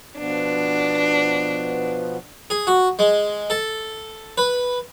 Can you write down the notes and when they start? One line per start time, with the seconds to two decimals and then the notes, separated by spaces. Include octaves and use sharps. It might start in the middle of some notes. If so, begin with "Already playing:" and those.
0.18 B2 F3 B3 D4
2.50 G#4
2.67 F#4
2.99 G#3
3.50 A4
4.38 B4